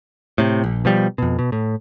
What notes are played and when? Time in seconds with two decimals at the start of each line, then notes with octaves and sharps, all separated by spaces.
0.38 A2 C3
0.64 A#1
0.85 B2 F3 G3
1.18 F2 B2
1.39 B2
1.52 A2